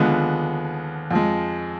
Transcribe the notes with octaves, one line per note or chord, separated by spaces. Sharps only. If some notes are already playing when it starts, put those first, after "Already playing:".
Already playing: D#2 D3 F3 G#3 B3
F2 F3 G#3